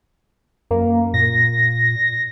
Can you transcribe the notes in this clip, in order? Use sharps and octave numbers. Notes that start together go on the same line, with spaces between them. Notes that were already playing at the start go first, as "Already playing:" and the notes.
F#2 A#3
A#2 A#6